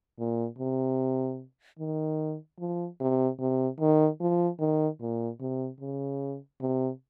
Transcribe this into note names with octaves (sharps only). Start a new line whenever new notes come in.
A#2
C3
D#3
F3
C3
C3
D#3
F3
D#3
A#2
C3
C#3
C3